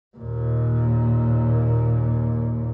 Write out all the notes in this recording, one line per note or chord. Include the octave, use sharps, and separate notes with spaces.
D#2 A#2